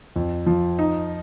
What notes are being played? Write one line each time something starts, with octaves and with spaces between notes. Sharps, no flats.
F2
F3
D#4